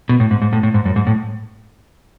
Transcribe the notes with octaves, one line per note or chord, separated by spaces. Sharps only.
B2
A2
G#2
G#2
A2
A2
G#2
F#2
G#2
A2